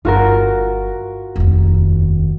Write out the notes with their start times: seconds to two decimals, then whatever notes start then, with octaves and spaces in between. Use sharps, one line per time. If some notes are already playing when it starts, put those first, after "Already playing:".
0.05 G1 F4 F#4 A#4
1.36 F1 D#2